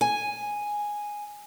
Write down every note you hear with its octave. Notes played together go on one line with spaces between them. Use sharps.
G#5